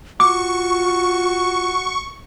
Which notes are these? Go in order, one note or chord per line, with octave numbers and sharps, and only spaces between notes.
F4 F#4 C#6 D6